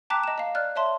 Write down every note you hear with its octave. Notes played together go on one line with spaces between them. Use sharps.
G5 A5 A#5 D6 F#6 B6
D#5 E7
D#5 F5
D5 F6 F#6
C#5 E5 A5 C6